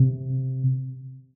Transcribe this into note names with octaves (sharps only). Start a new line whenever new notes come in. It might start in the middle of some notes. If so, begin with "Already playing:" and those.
Already playing: C3